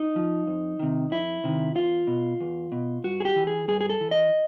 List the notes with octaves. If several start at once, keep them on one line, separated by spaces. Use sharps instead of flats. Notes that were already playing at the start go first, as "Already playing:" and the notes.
Already playing: D#4
F3
F2
C3 D#3
F2 E4
C3 D#3
E2 F4
B2
E2
B2
G2 F#4
G#4
G4
E3
G#4
G2 G#4
G#4
A4
E3
D#5